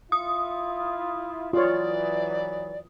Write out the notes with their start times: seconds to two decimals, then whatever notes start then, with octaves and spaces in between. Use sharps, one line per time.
0.12 E4 F4 D#6
1.53 E3 F#3 F4 C#5 D5